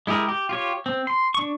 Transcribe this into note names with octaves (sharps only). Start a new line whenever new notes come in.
G#3 E4 G4 G#4 A#4
G4
F4 G4 C#5
C4
C6
D4 C#6